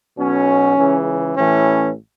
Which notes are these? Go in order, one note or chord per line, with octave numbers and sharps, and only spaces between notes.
B1 B2 C#4
C#2 C#3 E3
A1 A2 E3 C#4